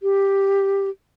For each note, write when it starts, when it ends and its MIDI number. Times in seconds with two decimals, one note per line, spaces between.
0.03 0.89 67